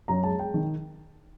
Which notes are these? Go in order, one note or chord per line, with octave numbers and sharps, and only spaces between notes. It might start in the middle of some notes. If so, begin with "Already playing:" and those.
F#2 A#5
G#3 A5
G#3 G5
D#3